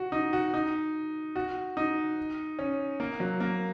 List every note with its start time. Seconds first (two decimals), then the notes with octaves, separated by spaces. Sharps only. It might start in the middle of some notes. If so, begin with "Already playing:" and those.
Already playing: F#4
0.12 D#4
0.33 F#4
0.54 D#4
1.36 F#4
1.77 D#4
2.59 C#4
3.00 A#3
3.20 F#3
3.40 A#3